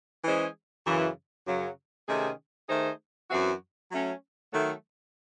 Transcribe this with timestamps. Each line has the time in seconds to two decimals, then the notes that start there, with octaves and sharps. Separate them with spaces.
0.25 E3 G#3 C#4 G#4 C5
0.85 F#2 C#3 E3
1.46 F#2 C#3 F#3
2.08 C3 D#3 A3 C#4 G#4
2.68 D#3 A3 D#4 G#4 C5
3.30 F#2 E3 C4 F#4
3.91 F#3 A3 C#4
4.52 D#3 F#3 A3